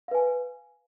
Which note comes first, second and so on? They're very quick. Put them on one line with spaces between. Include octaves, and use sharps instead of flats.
F5 B4 G#5